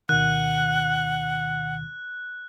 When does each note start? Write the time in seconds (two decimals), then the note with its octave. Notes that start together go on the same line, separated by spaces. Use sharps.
0.09 D2 B2 D#3 F#5 F#6